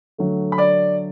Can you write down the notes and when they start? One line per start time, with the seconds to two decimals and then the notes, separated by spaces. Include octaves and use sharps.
0.18 D3 F#3 A3
0.52 B5
0.58 D5 D6